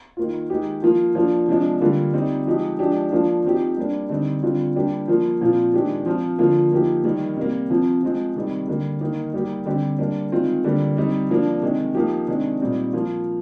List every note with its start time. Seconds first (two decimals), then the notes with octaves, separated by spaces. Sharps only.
0.17 D#3 A#3 F4
0.50 D#3 G#3 D#4 G4
0.82 F3 A#3 F4
1.15 F3 A#3 D4 F4
1.48 C3 F3 G#3 D4
1.81 D3 G3 A#3 F4
2.13 G3 C4 D#4
2.46 F3 G#3 D#4 G4
2.79 F3 G#3 D4 G4
3.12 F3 A#3 D4 F4
3.45 F3 C4 D#4 G4
3.77 G3 A#3 D4
4.09 D3 G3 C4 D#4
4.43 D3 G3 C4 F4
4.75 G3 A#3 D4 G4
5.08 F3 A#3 F4
5.41 A#2 F3 C4 F4
5.74 D#3 G#3 D4 G4
6.06 F3 C4 F4
6.39 D3 F3 A#3 F4
6.72 F3 A#3 D#4 G4
7.04 D#3 G3 A#3
7.37 C3 G3 A#3
7.70 C3 F3 C4
8.02 F3 G#3 C4
8.35 C3 D#3 G3
8.68 D3 G3 A#3
9.01 D#3 A#3 D#4
9.33 G3 A#3 D#4 G4
9.66 D3 G3 C4 G4
9.99 G3 A#3 D4
10.32 D#3 G#3 C4 F4
10.64 D3 G3 A#3
10.97 G3 C4 D#4
11.30 F3 A#3 D4
11.62 C3 D#3 G#3
11.95 F3 A#3 D#4 G4
12.28 C3 D#3 G#3 D4
12.60 A#2 G3 C4 D#4
12.93 F3 A#3 F4